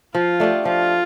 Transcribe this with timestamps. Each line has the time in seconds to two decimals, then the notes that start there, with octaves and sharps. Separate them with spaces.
0.14 F3 F4
0.40 A3 D4 G4
0.65 F3 F4